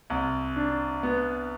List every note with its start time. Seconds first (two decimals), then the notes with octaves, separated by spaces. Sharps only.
0.10 C2
0.56 D4
1.03 B3